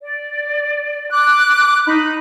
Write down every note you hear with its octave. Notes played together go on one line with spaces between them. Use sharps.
D5
D6 F#6
D#4 B5